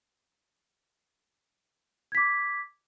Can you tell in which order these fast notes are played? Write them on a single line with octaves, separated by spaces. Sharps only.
G#6 B6 D6